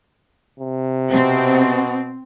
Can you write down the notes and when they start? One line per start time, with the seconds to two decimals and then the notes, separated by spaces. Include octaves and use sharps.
0.60 C3
1.11 B2 C4